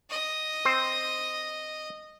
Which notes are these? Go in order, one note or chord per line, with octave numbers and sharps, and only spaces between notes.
D#5
C4 C5